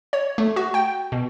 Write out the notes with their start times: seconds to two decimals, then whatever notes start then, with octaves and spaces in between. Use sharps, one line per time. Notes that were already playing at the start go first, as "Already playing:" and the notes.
0.13 C#5
0.38 A3
0.56 F#4
0.74 G5
1.12 B2